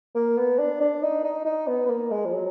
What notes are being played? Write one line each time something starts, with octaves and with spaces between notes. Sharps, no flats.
A#3
B3
D4
D4
D#4
D#4
D#4
B3
B3
A#3
G#3
F3
F#3